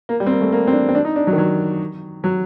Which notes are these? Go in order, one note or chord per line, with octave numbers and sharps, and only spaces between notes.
A#3
G3
C4
A#3
A3
A#3
C4
D4
C4
D4
D#4
D4
F#3
D#3
F#3
F#3